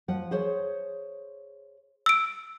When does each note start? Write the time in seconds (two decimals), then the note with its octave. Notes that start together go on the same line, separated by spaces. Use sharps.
0.08 F3 F#5
0.31 G#4 C5 C#5
2.06 E6 D7